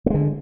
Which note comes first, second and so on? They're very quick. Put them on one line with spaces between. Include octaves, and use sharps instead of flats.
A3 G#3 D3